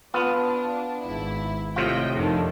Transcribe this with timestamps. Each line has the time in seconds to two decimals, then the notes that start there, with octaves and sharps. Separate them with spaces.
0.14 B3 D4 F4
1.01 G#1 E4
1.76 A2 C3 F4 D#5 G5
2.14 F2 D3 D#3